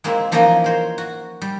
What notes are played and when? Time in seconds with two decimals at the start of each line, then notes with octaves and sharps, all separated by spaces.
0.04 G#3 A#3 C4 E4
0.32 E3 F3 A#3 C#4 D#4 D#5
0.64 A#4 C5 C#5
0.98 F#4
1.42 G3